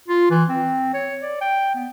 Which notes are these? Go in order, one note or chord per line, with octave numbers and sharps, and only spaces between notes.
F4
E3
C4
C#5
D5
G5
B3